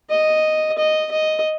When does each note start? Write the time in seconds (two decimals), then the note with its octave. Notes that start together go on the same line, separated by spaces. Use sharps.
0.10 D#5
0.78 D#5
1.12 D#5